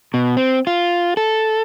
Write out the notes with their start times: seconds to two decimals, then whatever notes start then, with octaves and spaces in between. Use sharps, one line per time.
0.14 B2
0.37 C4
0.67 F4
1.17 A4